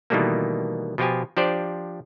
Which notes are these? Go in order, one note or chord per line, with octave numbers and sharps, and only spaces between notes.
B2 D#3 E3 G3 A3 A#3
B2 F3 F4 G4 G#5
F3 D4 G4 C5 D5